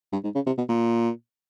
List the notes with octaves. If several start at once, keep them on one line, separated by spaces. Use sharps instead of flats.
G2
G#2
C#3
C3
B2
A#2